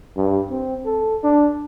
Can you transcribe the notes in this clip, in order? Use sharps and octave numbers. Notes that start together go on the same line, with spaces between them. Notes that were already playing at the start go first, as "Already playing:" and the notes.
G2
C4
A4
D4